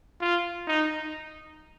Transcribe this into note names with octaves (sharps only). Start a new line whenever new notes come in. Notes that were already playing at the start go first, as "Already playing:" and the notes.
F4
D#4